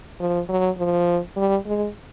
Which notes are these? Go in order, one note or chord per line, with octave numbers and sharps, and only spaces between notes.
F3
F#3
F3
G3
G#3